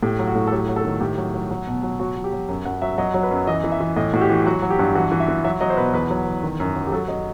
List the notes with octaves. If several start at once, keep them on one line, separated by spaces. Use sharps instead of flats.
A2 G4
F#3
F#4
A2
A4
F#3 G4
F#3
A4
D#3
A2 G4
F#3
F#3
F#3
B2
F#3
F#3 F#4
F#3
G4
F#3
F#2
F#2 F#5
F#3 E5
F#3 D#5
F#3
B4
F#2
E3 D#5
E3
E5
E3
A2 D#5
A2 F#4
G4
E3
F#3 F#4
F#3
G4
G2
E3 F#4
E3
E5
E3
F#3 E5
F#3 D#5
C5
B2 B4
E2 B4
F#3
E2
D#3
F#2
F#3
G4
F#3 A4
F#3 D#5